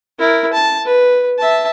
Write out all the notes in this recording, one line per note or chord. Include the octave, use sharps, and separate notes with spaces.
E4 A#4
A5
B4
E5 A5